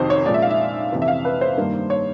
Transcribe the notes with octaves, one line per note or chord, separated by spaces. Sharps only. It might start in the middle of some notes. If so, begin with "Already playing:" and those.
Already playing: F2 C3 D#3 F#3 C5
C#5
A#2 F3 G#3 D5
E5
F5
E5
F2 C3 E3
E5
F5
B4
C5
G2 D#3 G3 A#3
C#5